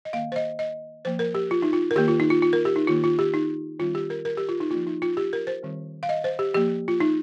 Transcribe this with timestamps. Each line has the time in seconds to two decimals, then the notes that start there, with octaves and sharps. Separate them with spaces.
0.05 D#5
0.13 D#3 A#3 F5
0.32 C5
0.36 D#5
0.59 D#5
1.05 F3 A#3 C5
1.19 A#4
1.35 G4
1.51 F4
1.62 D#4
1.73 F4
1.91 A#4
1.96 D#3 A#3 G4
2.08 F4
2.20 D#4
2.30 F4
2.42 F4
2.53 A#4
2.65 G4
2.76 D#4
2.87 D#3 A#3 F4
3.04 F4
3.19 G4
3.34 D#4
3.79 D#3 G3 C4 F4
3.95 G4
4.10 A#4
4.25 A#4
4.37 G4
4.49 F4
4.60 D#4
4.71 F3 A#3 F4
4.87 D#4
5.02 F4
5.17 G4
5.33 A#4
5.47 C5
5.63 D#3 G3 C4
6.03 F5
6.09 D#5
6.24 C5
6.39 G4
6.54 F3 A#3 G4
6.88 F4
7.00 D#4